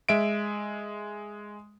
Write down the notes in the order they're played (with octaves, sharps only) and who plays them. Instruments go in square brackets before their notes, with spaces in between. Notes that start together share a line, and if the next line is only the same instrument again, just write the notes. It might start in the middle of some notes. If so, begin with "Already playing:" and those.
[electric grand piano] G#3 E5 D7